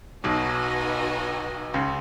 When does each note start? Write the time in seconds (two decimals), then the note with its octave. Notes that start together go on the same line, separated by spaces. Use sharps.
0.23 B1 B2 D#4 F#4 B4 D#5 G#5
1.74 C#2 C#3